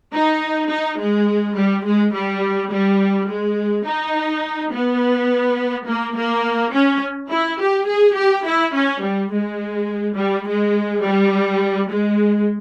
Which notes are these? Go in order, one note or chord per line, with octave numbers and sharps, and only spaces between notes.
D#4
D#4
G#3
G3
G#3
G3
G3
G#3
D#4
B3
A#3
A#3
C#4
E4
G4
G#4
G4
E4
C#4
G3
G#3
G3
G#3
G3
G#3